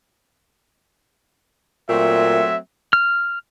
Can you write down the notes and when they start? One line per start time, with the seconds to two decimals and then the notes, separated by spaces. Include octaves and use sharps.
1.89 A#2 F#3 A3 C4 E5
2.93 F6